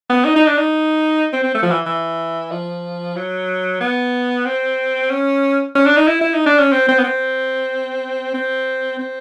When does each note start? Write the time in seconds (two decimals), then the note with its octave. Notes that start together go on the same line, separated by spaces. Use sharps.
0.09 B3
0.25 D#4
0.36 D#4
0.46 D4
0.57 D#4
1.33 C4
1.43 C4
1.54 A3
1.62 F3
1.71 E3
1.86 E3
2.52 F3
3.16 F#3
3.81 B3
4.46 C4
5.11 C#4
5.75 C#4
5.86 D4
5.97 D#4
6.07 E4
6.21 E4
6.34 D#4
6.46 D4
6.59 C#4
6.72 C4
6.88 C4
6.98 B3
7.04 C4
8.34 C4
8.99 C4